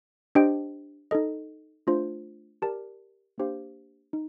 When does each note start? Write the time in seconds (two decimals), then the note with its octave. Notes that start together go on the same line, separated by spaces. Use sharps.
0.35 D4 G4 C5 D#5 G5
1.11 D#4 A4 D#5
1.87 A3 D4 F4 C5
2.62 G4 A#4 D5 A5
3.38 A#3 D4 G4 C5 F5
4.13 D#4